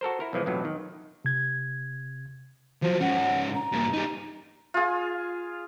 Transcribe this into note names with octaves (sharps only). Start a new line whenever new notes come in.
F#4 A4 A#4 C5
E4 A#4
B1 E3 F3 G#3
B1 F2 A2 E3 F#3
D#3
C3 G#6
F3 F#3 C5
G#2 C#4 F#5
A#5
G2 A#3
G3 D#4
F4 G#4